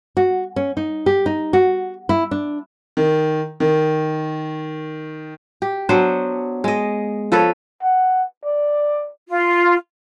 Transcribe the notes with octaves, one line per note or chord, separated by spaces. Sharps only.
F#4
C#4
D#4
G4
D#4
F#4
E4
D4
D#3
D#3
G4
F#3 B3 D4 C5
G#3 D#5
F3 A4 B4 C#5
F#5
D5
F4